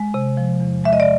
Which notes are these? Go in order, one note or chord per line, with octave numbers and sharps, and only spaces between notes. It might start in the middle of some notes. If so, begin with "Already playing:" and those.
Already playing: G#3
C3
F3
E2
G#3 E5
D#5
D5